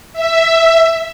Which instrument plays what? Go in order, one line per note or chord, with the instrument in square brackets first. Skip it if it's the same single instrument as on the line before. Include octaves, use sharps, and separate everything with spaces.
[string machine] E5